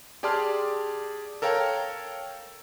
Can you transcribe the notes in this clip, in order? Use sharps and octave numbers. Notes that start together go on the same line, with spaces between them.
G4 G#4 D5 A5 C6 F6
A4 A#4 C#5 F5 G5 A#5